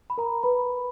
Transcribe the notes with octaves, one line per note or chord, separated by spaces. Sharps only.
B5
A#4 A#5
B4 B5